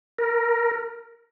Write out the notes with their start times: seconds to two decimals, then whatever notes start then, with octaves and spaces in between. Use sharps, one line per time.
0.19 A#4